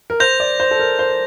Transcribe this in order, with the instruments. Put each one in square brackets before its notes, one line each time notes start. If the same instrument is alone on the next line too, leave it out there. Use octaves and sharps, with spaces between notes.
[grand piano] A#4
[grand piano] C5 [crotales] G6 A#6 F7
[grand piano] D5
C5
A4
A#4
C5